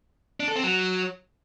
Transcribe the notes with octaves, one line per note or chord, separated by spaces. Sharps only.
D4
A4
C4
F#3